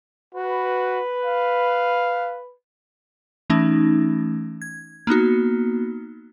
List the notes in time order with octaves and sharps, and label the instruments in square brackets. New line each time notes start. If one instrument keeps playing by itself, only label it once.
[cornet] F#4 [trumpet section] B4
[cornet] F5
[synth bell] E3 A3 C#4 D#4
G#6
A#3 B3 D#4 F#4